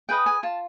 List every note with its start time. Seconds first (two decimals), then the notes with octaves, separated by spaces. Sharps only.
0.09 G#4 B4 D#5 G5
0.26 G#5
0.43 F4 A5